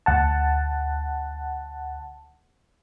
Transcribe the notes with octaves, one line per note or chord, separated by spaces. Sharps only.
D2 F#5 A5